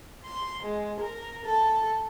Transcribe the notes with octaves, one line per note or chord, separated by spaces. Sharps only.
C6
G#3
A#4
A4